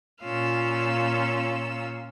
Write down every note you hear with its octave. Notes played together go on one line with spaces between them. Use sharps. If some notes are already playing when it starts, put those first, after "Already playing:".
A#2 C#4 F4 F5 E6